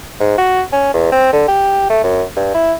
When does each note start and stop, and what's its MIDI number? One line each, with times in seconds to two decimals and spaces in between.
0.21 0.37 44
0.38 0.62 66
0.72 0.89 61
0.94 1.11 40
1.12 1.32 60
1.33 1.46 50
1.48 1.87 67
1.90 2.02 57
2.04 2.24 42
2.36 2.50 43
2.54 2.74 64